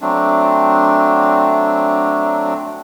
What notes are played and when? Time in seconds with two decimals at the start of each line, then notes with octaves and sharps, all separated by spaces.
0.01 F#3 A3 C4 D4